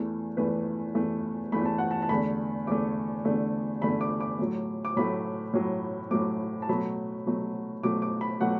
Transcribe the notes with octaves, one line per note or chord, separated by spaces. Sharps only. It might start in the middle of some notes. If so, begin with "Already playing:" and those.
Already playing: E2 E3 A3
E2 E3 A3 B4
E2 E3 A3
E2 E3 A3 B5
A5
F#5
A5
A5
E2 D3 A3 B5
E2 D3 A3 D6
E2 D3 A3
E2 D3 A3 B5
D6
D6
A2 F#3 A3
D6
A2 F#3 A3 B5
A2 F#3 A3
A2 F#3 A3 D6
A5
B2 F#3 A3 B5
B2 F#3 A3
B2 F#3 A3 D6
D6
B5
B2 F#3 A3 F#5